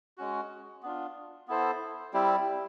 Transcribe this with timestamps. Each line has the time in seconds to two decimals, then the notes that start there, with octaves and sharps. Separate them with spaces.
0.18 G#3 C#4 F#4
0.83 B3 D4 F4
1.48 B3 E4 A4 C5
2.13 G3 C4 E4 G4